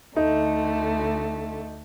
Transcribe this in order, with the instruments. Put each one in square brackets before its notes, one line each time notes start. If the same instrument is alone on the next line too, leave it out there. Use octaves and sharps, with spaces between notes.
[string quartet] D2 D3 A3 [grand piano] D#4